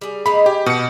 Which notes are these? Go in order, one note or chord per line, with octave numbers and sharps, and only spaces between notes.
G3 G#4
G#3 A#3 D#4 B5
G4 G#5
B2 G5 C#7